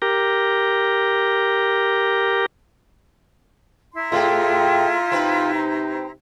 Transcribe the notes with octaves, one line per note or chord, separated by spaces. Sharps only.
G4 A#4
E4 A#5 C6
A2 A3 C4 F4 G4 G#4
C3 C4 D#4 B4